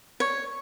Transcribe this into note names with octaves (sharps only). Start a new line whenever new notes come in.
C#5